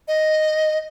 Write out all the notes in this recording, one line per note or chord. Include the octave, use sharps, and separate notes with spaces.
D#5